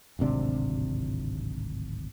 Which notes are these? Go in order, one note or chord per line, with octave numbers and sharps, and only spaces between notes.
D1 G#1 C3 D4